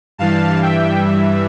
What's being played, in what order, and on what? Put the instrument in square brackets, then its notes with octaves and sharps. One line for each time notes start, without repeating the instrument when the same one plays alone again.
[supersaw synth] G2 E3 G3 F5 A5
E5 G5
E5